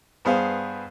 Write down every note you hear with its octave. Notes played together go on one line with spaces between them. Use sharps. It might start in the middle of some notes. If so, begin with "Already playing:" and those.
G2 B3 G#4 C5 F5